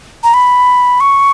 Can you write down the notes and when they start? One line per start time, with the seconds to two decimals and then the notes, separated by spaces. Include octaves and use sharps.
0.24 A#5
0.34 B5
1.00 C#6